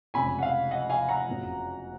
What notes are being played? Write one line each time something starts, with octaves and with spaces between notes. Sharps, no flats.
F1 F2 C#3 G#3 G#5 B5
F#5
F5
D#5 F#5
F5 G#5
F#5 A#5
F#1 F2 C#3 F#3